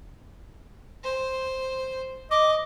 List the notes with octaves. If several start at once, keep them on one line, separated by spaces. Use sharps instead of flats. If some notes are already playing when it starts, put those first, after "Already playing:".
C5
D#5 D6